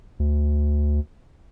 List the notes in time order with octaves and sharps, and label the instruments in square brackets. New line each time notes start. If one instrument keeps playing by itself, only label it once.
[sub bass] D2